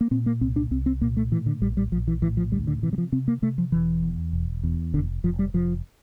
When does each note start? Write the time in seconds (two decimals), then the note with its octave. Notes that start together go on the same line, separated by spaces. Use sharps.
0.01 A#3
0.11 A#2 C4
0.26 A#3
0.41 C2 C4
0.56 D4
0.71 C2 C4
0.86 C4
1.01 A#2 A#3
1.17 A3
1.32 A2 E3
1.46 D3
1.62 A#1 G3
1.77 G3
1.92 A#1 F3
2.08 E3
2.22 A2 E3
2.37 F3
2.52 D2 G3
2.67 D3
2.82 C3 E3
2.93 G3
2.98 F3
3.12 C3 C4
3.28 A#3
3.42 C3 A3
3.58 F3
3.72 E1 E3
4.03 E2
4.33 E1
4.63 E2
4.93 F1 D3
5.24 F1 F3
5.39 G3
5.54 F1 F3